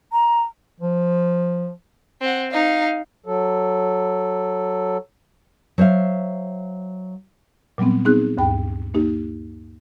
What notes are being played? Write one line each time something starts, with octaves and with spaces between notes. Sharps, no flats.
A#5
F3
C4 F#5
D#4 F5
F#3 A4
F#3 C5 E5 F5
A#2 F#3 G3 B3 C4
B3 C4 D#4 G#4 F#6
D2 G2 G5
A#3 D#4 G4